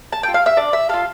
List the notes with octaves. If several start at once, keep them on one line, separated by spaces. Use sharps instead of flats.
A5
F4 A4 G5
F5
E5
D4 D5
E5
F4 A4 F5